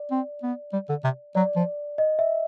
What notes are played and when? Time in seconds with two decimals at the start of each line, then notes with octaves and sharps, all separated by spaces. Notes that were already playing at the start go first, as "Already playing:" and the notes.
Already playing: D5
0.11 C4
0.43 B3
0.73 G3
0.89 D3
1.04 C3
1.35 F#3 D5
1.56 F3
1.98 D#5
2.19 E5